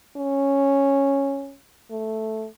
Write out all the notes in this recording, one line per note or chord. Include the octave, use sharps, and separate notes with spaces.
C#4
A3